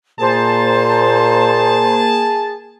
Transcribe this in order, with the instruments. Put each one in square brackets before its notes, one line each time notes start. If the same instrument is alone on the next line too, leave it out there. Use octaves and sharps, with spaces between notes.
[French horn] A#2 [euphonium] A#3 [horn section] G#4 A5 [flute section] C5 A#5